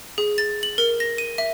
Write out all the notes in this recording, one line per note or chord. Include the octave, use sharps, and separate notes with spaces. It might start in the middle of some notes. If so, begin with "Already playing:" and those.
G#4
A6
F#7
A#4
A#6
D#7
E5